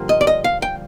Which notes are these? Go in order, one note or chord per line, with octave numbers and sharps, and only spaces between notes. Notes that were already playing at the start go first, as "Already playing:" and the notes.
Already playing: G2 D3 F3 A#3
D#5
D5
D#5
F5
G5